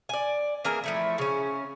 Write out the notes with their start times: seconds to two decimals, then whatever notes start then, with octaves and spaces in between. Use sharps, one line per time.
0.09 D5 G#5
0.64 E3 A#3 G#4 A#4
0.84 F3 A3 E4
1.18 C#3 C#4